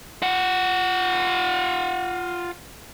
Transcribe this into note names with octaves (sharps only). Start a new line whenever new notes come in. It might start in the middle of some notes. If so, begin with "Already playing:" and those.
F4 F#5